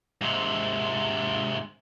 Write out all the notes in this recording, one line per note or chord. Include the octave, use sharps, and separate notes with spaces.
G#2 C3